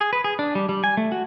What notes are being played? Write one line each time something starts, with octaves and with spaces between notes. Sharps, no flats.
G#4
B4
G#4
D4
G3
G3
G#5
A3
F#4